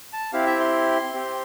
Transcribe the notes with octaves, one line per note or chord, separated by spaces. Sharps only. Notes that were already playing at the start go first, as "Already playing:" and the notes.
A5
C4 E4 G4 F5
E5
C6
C4 G4